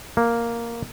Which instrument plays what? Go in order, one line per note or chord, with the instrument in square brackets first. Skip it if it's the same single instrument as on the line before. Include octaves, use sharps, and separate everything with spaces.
[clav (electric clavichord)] A#3